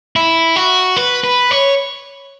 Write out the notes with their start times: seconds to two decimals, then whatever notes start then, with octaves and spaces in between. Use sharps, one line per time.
0.16 E4
0.56 F#4
0.96 B4
1.24 B4
1.51 C#5